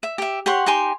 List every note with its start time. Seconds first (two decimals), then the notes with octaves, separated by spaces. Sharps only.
0.03 E5
0.18 G4 E5
0.46 G4 C#5 F#5 C6
0.66 D#4 G4 G#5 C6